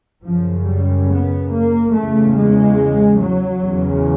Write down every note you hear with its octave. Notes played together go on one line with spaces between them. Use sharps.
F#2 C#3 F3
G3
B3
A#3
E2 C#3 A3
G#3
F#3
E2 C#3